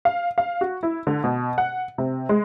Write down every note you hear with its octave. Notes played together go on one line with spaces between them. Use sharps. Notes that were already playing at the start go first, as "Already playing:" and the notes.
F5
F5
F#4
E4
D3
B2
F#5
C3
G#3